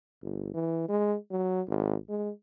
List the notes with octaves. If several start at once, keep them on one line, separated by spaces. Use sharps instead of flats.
G1
E3
G#3
F#3
G#1
G#3